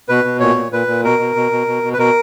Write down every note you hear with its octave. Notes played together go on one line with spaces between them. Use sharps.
B2 B4
B2
A#2 C#5
A#2
A#2 B4
A#2
B2 A#4
B2
B2
B2
B2
B2
B4
B2 A#4